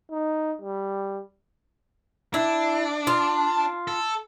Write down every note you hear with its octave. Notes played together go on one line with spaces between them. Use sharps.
D#4
G3
D4 E4
F4
A4